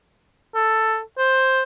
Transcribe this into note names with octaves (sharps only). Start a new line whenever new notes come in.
A4
C5